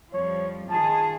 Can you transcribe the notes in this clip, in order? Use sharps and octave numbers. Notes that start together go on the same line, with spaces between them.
F2 F3 G3 C#5
D#3 F4 G#4 A5